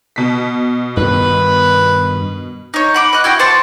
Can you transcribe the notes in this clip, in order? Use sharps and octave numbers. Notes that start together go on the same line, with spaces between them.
B2 B6
G2 D#3 B4
D#4 C#5
F#5 B5 D6
D#5 F#6
E4 F#4 D#5 G5
C5 D5 A5 C#6